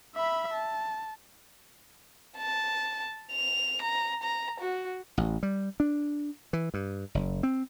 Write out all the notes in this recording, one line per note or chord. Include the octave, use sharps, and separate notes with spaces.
E5 B5
A5
A5
F7
A#5
A#5
F#4
A1
G3
D4
E3
G2
F#1
C4